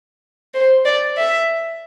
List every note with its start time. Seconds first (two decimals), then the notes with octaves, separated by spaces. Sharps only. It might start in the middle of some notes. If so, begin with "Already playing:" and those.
0.54 C5
0.85 D5
1.18 E5